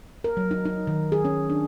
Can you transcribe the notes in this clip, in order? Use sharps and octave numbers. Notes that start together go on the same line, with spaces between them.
A#4
F#3
D#4
D#4
D#3
G#4
C#4
D4